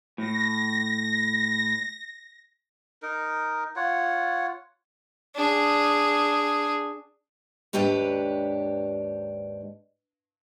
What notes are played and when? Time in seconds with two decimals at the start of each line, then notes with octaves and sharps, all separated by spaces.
0.18 A2 A#6
3.03 D#4 A#4
3.76 F4 C#5 F#5
5.35 D4 G#4
7.73 D#2 G#2 D4 G4 B4 C#5